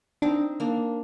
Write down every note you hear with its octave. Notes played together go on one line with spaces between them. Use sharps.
C4 D4 D#4
A#3 D4